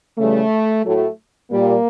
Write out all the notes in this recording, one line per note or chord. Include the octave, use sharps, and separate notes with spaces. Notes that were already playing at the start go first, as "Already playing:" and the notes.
C#3 E3 G3 A3
A2 F#3 A3
A#2 G3 A#3